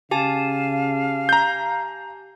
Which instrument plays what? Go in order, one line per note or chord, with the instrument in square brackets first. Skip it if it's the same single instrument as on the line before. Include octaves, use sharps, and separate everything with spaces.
[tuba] C#3 [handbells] G4 G#5 A5 [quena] F5
[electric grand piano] A#5 G6